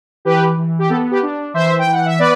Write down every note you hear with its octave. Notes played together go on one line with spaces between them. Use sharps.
E3 G4 B4
E3
G4
B3 A4
G4 B4
D4
E3 C5 E5
G5
E3
F#5
E5
B3 B4 D5